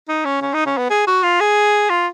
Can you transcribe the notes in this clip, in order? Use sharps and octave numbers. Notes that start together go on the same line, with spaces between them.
D#4
C#4
C#4
D#4
C#4
B3
G#4
F#4
F4
G#4
F4